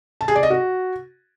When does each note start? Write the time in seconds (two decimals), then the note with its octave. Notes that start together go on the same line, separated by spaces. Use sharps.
0.21 A5
0.28 G#4
0.35 D5
0.43 D#5
0.50 F#4